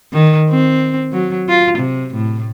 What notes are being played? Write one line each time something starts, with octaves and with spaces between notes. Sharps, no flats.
D#3
C4
F#3
F4
C3
A2